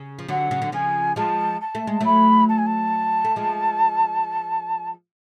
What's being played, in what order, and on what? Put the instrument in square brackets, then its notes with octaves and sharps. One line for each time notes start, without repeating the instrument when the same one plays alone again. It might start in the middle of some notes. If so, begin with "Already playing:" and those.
Already playing: [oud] C#3
F3
[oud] D3 F#3 [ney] F#5
[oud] C#3
D3
[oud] C#3 F3 [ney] G#5
[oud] F3 G#3 [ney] A5
[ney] A5
[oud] A3
G#3
[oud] F#3 A3 [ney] B5
[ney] A5
G#5
A5
[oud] A3
F3 G#3